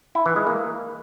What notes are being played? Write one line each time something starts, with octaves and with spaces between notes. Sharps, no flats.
E4
E3
G#3
A#3